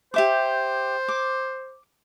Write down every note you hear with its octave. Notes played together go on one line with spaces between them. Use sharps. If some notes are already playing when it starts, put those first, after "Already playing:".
G4 C5 E5 D6
D6